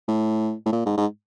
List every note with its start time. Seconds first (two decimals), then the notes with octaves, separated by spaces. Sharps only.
0.08 A2
0.66 A2
0.73 A#2
0.86 G#2
0.97 G#2